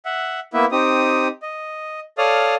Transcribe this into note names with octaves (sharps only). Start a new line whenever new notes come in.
E5 F#5
A#3 B3 E4 B4 E5
C4 D#4 G4 D#6
D#5
A4 C#5 D5 F5 D#6 F6